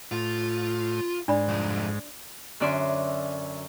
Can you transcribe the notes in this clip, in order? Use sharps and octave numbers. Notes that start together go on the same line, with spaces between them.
A2 F4
G#2 D4 D5 B5
C2 F2
F#2 D3 C#4 D5 E5 C6